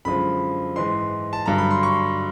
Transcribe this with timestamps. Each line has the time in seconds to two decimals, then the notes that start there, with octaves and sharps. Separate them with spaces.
0.05 F#2 D3 F3 G#3 B5
0.76 G#2 E3 G#3 C6
1.33 A5
1.46 G2 D3 F#3 A#5
1.58 B5
1.70 C6
1.83 C#6